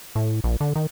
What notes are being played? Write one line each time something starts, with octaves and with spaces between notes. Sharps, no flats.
A2
A#1
D3
D#3